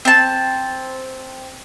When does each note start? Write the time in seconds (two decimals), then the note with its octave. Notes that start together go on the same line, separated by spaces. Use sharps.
0.05 C4 A5